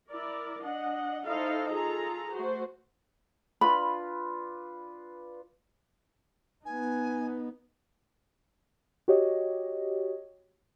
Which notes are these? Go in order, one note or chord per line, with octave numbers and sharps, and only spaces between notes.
E4 A#4 D5
D4 D#5 F#5
D#4 E4 A4 C5 D#5 F5
F4 G#4 A4 A#5
A3 F#4 C5
D4 F4 B4 B5
B3 D#4 G#5
F#4 G4 C#5 D#5